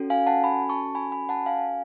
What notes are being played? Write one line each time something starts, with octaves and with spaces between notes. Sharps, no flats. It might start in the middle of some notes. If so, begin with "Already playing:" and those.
Already playing: C#4 F#4 A4
F5 G#5
F#5 A5
G#5 B5
A5 C#6
G#5 B5
G#5 B5
F#5 A5
F5 G#5